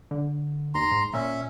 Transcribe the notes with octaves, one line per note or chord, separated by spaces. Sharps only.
D3
D#2 A#5 C6
G#2
A#2 C#4 E5